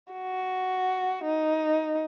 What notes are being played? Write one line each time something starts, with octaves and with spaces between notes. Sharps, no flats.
F#4
D#4